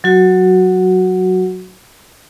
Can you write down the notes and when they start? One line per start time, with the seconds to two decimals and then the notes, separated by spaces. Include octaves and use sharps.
0.04 F#3 F#4